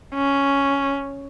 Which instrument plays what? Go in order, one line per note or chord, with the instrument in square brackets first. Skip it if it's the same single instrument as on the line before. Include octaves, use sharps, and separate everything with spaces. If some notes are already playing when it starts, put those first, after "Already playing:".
[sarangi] C#4